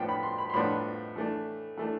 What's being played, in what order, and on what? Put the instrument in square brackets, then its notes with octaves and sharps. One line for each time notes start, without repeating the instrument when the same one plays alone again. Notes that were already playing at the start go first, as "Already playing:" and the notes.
Already playing: [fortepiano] A2 F3 B3 D4 G5
B5
C6
B5
C6
A2 F3 B3 D4 B5
E3 A3 D4
E3 A3 D4